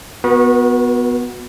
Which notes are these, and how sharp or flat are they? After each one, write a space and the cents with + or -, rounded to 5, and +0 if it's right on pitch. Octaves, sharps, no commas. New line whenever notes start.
B3 +0 F#4 -20 B4 -45